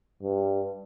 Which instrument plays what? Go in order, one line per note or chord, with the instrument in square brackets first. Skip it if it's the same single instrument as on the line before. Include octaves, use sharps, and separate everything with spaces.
[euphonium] G2